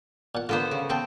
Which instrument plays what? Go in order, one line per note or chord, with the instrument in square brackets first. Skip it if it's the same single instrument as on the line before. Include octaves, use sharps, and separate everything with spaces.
[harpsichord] A#2 F#5
[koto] D3 B3 C5 [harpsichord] A#3 F4
[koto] C#3
[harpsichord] B3 A4 G5 [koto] C4